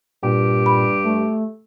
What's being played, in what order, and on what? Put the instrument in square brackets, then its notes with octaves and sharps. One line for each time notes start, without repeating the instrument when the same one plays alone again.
[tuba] G2 [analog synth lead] A#2 [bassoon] G4
[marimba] B5
[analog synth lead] A3